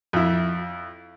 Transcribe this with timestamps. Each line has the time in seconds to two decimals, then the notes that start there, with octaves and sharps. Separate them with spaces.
0.13 F2 E4